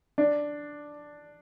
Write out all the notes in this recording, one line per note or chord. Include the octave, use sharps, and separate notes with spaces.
D4